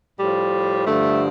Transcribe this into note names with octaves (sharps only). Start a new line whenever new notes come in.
A2 F3 G3
G2 D3 F3 A3